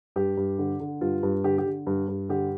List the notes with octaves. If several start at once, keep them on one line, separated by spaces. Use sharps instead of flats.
G2 G4
G2
D3
D3
G2 F4
G2
D3 G4
G4
D3
G2
G2
D3 G4